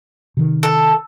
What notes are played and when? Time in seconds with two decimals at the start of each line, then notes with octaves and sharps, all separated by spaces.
0.37 C3 D#3
0.63 A4